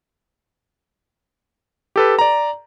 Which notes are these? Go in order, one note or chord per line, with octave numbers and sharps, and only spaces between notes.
G4 A4 B4
D5 A#5